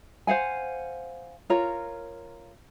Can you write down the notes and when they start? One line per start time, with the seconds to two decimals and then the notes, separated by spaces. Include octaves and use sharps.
0.27 C5 F5 F#5 G#5
1.50 F4 A#4 C#5 A#5